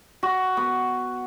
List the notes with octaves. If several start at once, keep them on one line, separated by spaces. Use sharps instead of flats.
F#4
B3